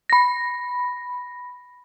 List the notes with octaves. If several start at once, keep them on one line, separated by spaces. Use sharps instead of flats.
B5 A#6